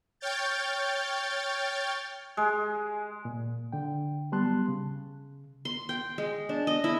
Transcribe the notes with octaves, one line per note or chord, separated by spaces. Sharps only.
C#5 G5 F6 G6 A6
G#3
A#2
D3 G5
F#3 G3 B3 A5 C6 F#6
C#3
C6
G5
G#3
D4
D#5
E4